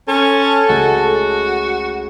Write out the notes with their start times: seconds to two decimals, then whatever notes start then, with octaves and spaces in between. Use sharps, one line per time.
0.08 C#4 A4 C6
0.69 C#2 A3 F#4 G#5